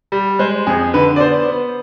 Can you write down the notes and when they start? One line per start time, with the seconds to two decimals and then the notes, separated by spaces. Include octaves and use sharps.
0.12 G3
0.39 G#3 C5
0.67 F2 G#4
0.94 D3 B4
1.16 D5
1.20 B3 C5
1.48 B3